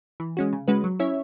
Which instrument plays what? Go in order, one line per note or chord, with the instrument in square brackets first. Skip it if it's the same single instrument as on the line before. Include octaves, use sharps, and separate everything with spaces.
[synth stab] E3
G#3 C#4 F#4
C#3
G#3 C#4 F#4 B4
F#3
C#4 E4 C#5 E5